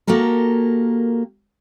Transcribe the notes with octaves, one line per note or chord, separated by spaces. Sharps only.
A#3 F#4 G4 A4 A#4